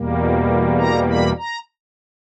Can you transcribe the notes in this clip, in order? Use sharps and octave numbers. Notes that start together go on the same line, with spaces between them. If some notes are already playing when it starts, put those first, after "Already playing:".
Already playing: E2 B2 G3 A#3
A#5
B5
A#5